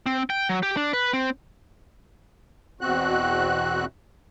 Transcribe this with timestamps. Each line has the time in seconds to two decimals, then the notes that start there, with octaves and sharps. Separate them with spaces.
0.06 C4
0.30 G5
0.49 F#3
0.63 G4
0.77 D4
0.93 B4
1.13 C4
2.81 E2 B2 C4 F#4 F#6